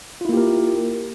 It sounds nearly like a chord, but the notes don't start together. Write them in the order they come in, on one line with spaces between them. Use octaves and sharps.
F4 E4 A#3 G4 A#4